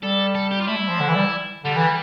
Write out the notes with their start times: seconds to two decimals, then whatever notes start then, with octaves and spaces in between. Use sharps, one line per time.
0.03 G3 A4
0.35 A4
0.51 G4
0.61 F4
0.68 A3 E4
0.78 G3
0.89 F3
1.00 D3
1.09 E3
1.16 G3
1.64 D3 G3
1.76 E3